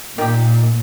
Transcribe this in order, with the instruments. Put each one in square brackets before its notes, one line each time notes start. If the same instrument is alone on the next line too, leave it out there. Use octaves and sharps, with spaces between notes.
[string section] A#2 [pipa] D#3 G4